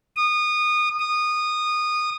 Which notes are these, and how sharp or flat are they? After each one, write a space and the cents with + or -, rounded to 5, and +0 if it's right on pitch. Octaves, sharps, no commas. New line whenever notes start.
D#6 -25
D#6 -20